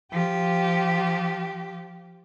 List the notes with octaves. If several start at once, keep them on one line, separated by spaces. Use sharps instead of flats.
F3 G4